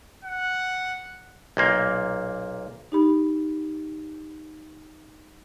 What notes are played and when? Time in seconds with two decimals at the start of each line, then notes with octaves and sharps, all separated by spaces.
0.24 F#5
1.57 B1 A#2 A#3
2.92 D#4 G4 B5